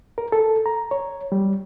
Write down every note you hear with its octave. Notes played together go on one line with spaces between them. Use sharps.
A#4
A4
A#5
C#5
G3